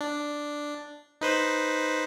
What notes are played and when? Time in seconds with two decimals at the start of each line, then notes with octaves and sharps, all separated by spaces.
0.01 D4
1.21 D#4 B4 C5